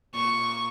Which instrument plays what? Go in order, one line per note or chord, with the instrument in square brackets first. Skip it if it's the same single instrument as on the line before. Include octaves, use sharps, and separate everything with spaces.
[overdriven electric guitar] A#2 [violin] C#6